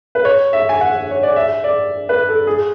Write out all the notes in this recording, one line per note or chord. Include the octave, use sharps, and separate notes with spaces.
B4
C#5
E5
G#5
F#5
C#5
D5
E5
D5
B4
A4
G#4